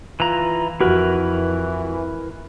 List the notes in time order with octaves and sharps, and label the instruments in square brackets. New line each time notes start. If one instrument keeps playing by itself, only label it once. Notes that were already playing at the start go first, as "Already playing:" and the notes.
[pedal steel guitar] E3 A#5 [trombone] F4
[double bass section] F2 [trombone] E3 [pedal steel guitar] E4 A#4 B4 [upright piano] F#4